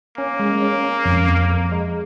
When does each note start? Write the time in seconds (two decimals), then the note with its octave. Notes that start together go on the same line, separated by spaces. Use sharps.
0.17 A#3 C#4
0.40 G#3
0.62 C#4
0.84 C#4
1.05 F2
1.28 F2
1.49 F2
1.72 G#3